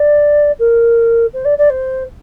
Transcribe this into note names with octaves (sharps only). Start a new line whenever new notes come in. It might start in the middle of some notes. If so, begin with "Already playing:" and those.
Already playing: D5
A#4
C5
D5
D5
C5